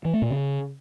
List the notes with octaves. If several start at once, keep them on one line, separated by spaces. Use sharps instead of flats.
E3
A3
A#2
C#3